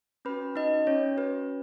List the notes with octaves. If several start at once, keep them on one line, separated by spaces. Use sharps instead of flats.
C#4 F#4 B4 B5
D#4 D#5
C#4 C#5
C#4 F#4 B4